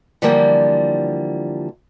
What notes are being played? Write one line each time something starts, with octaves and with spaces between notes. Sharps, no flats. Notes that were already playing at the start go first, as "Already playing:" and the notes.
D3 E3 F3 G3 A#3